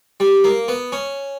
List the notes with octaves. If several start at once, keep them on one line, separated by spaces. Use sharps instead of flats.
G3
A#3
B3
C#4